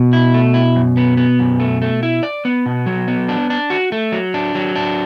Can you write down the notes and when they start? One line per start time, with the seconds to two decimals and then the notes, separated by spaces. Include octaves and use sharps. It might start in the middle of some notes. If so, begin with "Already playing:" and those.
Already playing: B2
0.13 E4
0.34 A3
0.54 E4
0.76 F#2
0.97 B3
1.17 B3
1.39 F#2
1.60 A3
1.82 A3
2.03 E4
2.23 D5
2.45 B3
2.66 B2
2.86 F#3
3.08 B3
3.29 D4
3.50 D4
3.70 F#4
3.92 A3
4.12 F#3
4.34 D4
4.55 F#3
4.76 D4